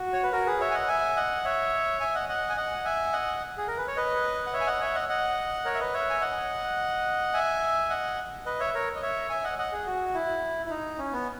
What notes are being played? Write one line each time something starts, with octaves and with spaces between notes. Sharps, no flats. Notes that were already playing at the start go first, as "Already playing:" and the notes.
Already playing: F#4
C#5
B4
F#4 A#4
G#4 B4
C#5 E5
G#5
D#5 F#5
E5 G#5
D#5 F#5
C#5 E5
E5 G#5
D#5 F#5
D#5 F#5
G#5
D#5 F#5
E5 G#5
D#5 F#5
G#4
A#4
B4
C#5
B4 D#5
F#5
C#5 E5
G#5
D#5 F#5
C#5 E5
D#5 F#5
D#5 F#5
A#4 C#5
E5
B4 D#5
C#5 E5
G#5
D#5 F#5
E5 G#5
D#5 F#5
B4 D#5
C#5 E5
A#4 C#5
D#5
C#5 E5
E5 G#5
D#5 F#5
D#5 F#5
G#4
F#4
E4
E4
D#4
C#4
B3